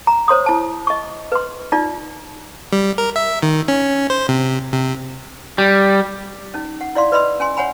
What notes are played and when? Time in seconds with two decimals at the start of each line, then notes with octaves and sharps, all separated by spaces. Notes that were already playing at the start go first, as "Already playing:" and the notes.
0.07 A#5
0.28 C5 C#5 C6 D#6
0.46 E4 A5
0.87 D#5 C#6
1.32 B4 C6
1.72 D#4 F4 D5
2.73 G3
2.98 A#4
3.16 E5
3.42 D#3
3.68 C#4
4.10 C5
4.29 C3
4.73 C3
5.58 G3
6.54 C#4 D#4
6.81 F#5
6.95 E4 D5 F5 C6
7.12 B4 D5 D#5 B5 C6 E6
7.40 C#4 G#5 C6
7.57 C#5 F#5 G#5 B5